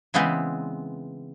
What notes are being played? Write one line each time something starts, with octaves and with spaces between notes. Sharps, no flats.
C#3 E3 G#3 B3 C4